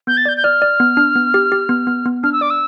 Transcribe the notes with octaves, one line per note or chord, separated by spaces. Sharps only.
B3 G6
A6
D5 G6
G6
D5 F6
D5
B3
D4
B3
G4
G4
B3
B3
B3
D4 F6
E6
D5 D6
E6